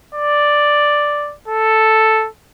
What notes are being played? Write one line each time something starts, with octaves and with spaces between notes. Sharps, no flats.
D5
A4